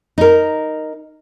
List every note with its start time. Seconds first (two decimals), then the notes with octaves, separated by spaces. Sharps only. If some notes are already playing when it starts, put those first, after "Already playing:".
0.18 D#4 A#4